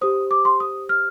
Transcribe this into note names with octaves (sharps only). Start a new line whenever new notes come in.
G4 C5 D#6
D6
C6
D#6
F6